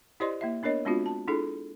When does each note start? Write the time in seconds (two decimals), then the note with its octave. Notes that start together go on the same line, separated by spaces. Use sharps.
0.20 E4 G4 C5 D5 D#5 C6
0.41 A#3 E4 E5
0.63 B3 D4 A#4 C#5 D#5
0.85 G#3 B3 C4 D4 F4 F#4
1.06 A5
1.28 D4 E4 F4 G#4 A4